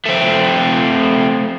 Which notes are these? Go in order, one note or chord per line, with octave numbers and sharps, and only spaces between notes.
A3 C4